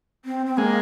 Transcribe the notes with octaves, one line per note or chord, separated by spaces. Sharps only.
C4
C4
G#3 A#3